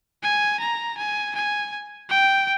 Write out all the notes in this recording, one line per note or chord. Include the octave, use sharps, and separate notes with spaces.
G#5
A#5
G#5
G#5
G5